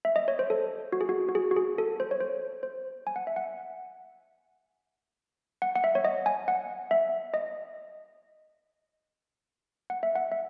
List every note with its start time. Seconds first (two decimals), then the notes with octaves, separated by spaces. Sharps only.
0.05 E5
0.16 D#5
0.28 C#5
0.39 C5
0.50 A4
0.92 F#4
1.01 G#4
1.09 F#4
1.29 F#4
1.35 G#4
1.51 F#4
1.56 G#4
1.78 A4
2.00 C5
2.11 C#5
2.20 C5
2.63 C5
3.07 G#5
3.16 F#5
3.27 E5
3.36 F#5
5.62 F#5
5.75 F#5
5.84 E5
5.95 C#5
6.05 D#5
6.26 G#5
6.48 F#5
6.91 E5
7.34 D#5
9.90 F#5
10.03 E5
10.15 F#5
10.32 E5